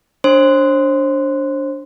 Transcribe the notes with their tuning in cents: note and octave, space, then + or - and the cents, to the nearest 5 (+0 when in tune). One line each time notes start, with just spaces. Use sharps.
D4 -15 C5 +35 C6 -20